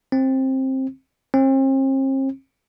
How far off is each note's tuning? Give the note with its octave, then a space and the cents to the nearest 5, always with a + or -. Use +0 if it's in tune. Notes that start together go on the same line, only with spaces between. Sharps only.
C4 +15
C4 +40